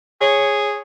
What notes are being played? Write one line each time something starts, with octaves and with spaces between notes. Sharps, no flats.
G#4 C#5